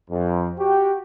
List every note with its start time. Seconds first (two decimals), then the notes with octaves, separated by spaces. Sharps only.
0.10 F2
0.58 F#4 G4 G5